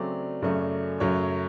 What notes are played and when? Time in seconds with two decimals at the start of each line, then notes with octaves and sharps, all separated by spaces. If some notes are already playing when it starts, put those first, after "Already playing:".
Already playing: C#3 F#3 A3 C4 D5
0.42 F#2 C#3 F#3 A3
1.00 F#2 C#3 F#3 A3 C#5